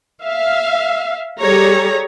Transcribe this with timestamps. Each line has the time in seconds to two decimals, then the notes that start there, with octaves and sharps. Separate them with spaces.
0.24 E5 F5
1.39 G3 G#4 A4 C#5 A#5